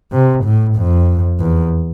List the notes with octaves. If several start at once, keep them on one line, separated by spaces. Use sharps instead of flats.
C3
A2
F2
E2